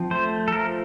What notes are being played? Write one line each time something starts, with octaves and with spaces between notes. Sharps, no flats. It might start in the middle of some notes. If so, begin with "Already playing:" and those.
Already playing: F3 C4
A3 C5
A4
F3 A#4